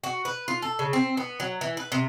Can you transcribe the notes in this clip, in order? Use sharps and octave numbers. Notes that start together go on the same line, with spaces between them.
F#4
B4
F4
A4
C#3
C4
B3
F#3
E3
B4
C3